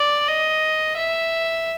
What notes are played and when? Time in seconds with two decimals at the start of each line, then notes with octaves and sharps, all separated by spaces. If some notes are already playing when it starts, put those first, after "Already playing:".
Already playing: D5
0.28 D#5
0.97 E5